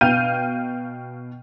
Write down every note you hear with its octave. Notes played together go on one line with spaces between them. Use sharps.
B2 F5 G5 F6 G6 D#7